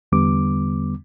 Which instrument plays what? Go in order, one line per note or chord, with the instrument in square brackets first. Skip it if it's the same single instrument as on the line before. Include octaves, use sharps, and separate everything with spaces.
[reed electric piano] E2 D3 G3 B3 D6